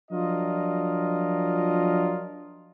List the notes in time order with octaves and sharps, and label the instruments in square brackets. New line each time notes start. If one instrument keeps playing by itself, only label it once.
[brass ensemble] F3 F#3 D4 F4 A#4 D#5